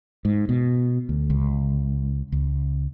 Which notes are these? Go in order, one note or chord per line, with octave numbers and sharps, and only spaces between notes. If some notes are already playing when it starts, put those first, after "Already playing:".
G#2
B2
D2
C#2
C#2